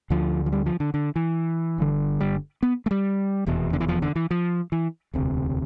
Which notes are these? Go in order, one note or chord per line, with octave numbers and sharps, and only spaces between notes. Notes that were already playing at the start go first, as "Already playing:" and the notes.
D2 D3 F3
F3
G3
F3
D3
D3
E3
G1 G2 D3
G3
B3
A3
G3
F1 E2 B2
D3
E3
F3
D3
E3
F3
E3
E1 D2 C3